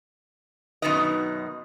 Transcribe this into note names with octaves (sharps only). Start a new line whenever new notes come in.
F#2 B2 D#3 D#4 B4 D#5